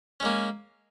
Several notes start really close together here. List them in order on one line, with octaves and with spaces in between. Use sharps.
C#4 G#3 A#3